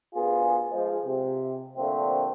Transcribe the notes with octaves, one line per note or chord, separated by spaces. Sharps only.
D2 B3 F4 G#4
F3 G#3
C3
A#2 D3 F3 A3 C4